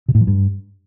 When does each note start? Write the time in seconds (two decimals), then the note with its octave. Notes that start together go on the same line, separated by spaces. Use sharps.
0.08 C3
0.15 A2
0.21 F3
0.27 G2